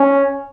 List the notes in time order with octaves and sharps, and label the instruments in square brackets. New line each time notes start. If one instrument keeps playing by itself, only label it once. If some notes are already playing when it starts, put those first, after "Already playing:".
Already playing: [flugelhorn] C#4